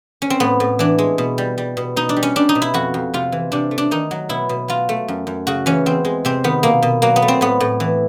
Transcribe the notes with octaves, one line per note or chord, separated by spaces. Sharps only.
C#4
C4
A2 B3
A2
E3 D4
G#3
B2
G3
G3
B2
B2 D#4
D4
G3
C#4
G3 D4
D#4
B2
E4
F2 F#4
F2
C3 F4
E3
C3 D4
A3
D4
D#3 D#4
F#3
B2 E4
B2
F#3 F4
A3
F#2
F#2
C#3 F#4
E3 C#4
E2 C4
G#3
C3 C4
D#3 B3
B2 A#3
B2
F#3 A#3
B3
A3
C4
A2 B3
A2
E3